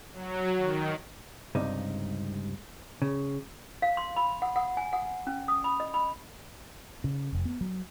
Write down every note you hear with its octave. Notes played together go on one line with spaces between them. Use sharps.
F#3
D#3
C#2 G2 C3 D#4
C#3
F5
C6
B5
F#5
F#5
G#5
F#5
C#4
D#6
B5
D#5
B5
C#3
F1
B3
F#3